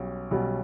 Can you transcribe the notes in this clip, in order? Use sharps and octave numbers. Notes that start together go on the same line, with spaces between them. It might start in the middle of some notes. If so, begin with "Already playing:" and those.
Already playing: B1 B2 G3 C#4
B1 B2 G3 C#4